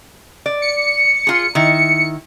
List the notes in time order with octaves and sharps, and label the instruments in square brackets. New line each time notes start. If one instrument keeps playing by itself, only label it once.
[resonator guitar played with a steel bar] D5
[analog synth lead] C#7
[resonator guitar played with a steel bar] F4 G#4
D#3 E4